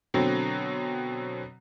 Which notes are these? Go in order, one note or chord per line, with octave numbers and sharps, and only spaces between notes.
B2 D3 F#3 C4